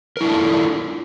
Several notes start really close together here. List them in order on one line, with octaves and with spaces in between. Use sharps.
A#4 E4 D4 A4 F4